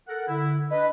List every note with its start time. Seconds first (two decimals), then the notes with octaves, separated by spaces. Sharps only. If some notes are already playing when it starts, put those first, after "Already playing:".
0.09 A4 A#4 F#5
0.28 D3 E4
0.70 D4 B4 D#5